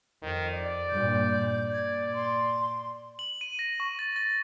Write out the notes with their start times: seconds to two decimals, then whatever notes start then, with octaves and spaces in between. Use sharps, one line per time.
0.22 F2 D#3
0.54 D5
0.89 G2 A#2 G6
1.72 A#2 G#6
2.14 C6
3.19 F#7
3.41 D#7
3.59 A#6
3.80 C#6
3.99 A6
4.16 A6